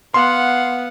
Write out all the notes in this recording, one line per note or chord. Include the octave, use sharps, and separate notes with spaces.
B3 F5 F#5 C6